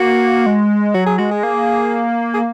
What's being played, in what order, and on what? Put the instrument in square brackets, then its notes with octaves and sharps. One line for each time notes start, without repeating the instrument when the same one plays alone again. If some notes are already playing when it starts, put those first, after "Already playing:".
Already playing: [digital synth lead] A#3 [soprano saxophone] F#4
[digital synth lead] G#3
[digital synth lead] F#3 [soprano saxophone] F#4
[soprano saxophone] G#4
[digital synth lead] G#3 [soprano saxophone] F#4
[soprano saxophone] G#4
[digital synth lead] A#3
[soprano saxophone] G#4